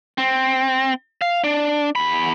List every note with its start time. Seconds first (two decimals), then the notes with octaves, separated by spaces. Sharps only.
0.18 C4
1.21 F5
1.44 D4
1.95 E2 B5